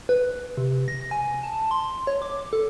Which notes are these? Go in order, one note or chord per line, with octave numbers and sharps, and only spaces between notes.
B4
C3
A#6
G#5
A5
C6
C#5
D6
A4